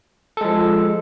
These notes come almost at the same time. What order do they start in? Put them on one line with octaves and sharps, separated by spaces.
A4 G#3 F3